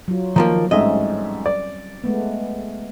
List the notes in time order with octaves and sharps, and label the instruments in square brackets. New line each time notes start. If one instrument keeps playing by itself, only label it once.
[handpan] F#3 F4
[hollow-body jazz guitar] D#3 F3 A#3 [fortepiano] A#5
[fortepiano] A1 G#2 E5 [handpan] G3 C4 C#4 [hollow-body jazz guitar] D#5
[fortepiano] D5
[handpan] G#3 A3 B3